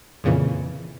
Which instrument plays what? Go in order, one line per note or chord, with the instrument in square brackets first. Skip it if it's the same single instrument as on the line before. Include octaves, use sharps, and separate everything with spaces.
[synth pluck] F2 A#2 C#3 E3